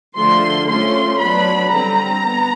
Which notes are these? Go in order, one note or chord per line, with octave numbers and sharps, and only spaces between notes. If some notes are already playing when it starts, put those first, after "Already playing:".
D3 F3 A3 C6
F3 A3 C#4 C6
F#3 B3 D4 B5
D3 G3 C4 A#5
B3